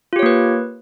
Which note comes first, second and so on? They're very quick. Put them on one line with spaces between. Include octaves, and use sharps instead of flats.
F4 G4 C#5 A#3 B4